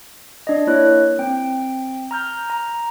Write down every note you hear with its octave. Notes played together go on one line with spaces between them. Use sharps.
D4 D5 D#5
A#3 E4 C#5 F#6
C4 G5
A#5 F6 G6
A#5